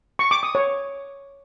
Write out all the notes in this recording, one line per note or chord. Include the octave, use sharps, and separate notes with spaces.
C#6
D6
D#6
C#5